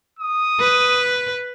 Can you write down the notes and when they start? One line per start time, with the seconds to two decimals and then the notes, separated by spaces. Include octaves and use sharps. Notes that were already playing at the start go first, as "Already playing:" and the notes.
0.19 D#6
0.60 B4